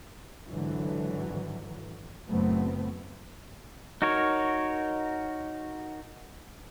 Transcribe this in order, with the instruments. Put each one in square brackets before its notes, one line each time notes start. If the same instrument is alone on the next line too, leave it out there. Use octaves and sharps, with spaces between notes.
[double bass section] G#1 D3 E3 F#3
F#1 A#2 F#3 A3 B3 C4
[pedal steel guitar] D#4 F#4 A#4 C#5